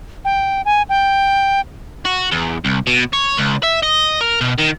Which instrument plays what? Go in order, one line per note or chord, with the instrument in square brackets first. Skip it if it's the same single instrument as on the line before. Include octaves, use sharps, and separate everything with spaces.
[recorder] G5
G#5
G5
[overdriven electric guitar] F#4
E2
C2
B2
C#5
C#2
E5
D#5
A#4
B2
D#3